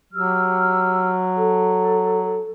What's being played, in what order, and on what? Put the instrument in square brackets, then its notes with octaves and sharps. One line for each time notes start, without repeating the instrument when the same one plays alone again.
[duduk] F#3 [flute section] G4 E6 F6
[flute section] A4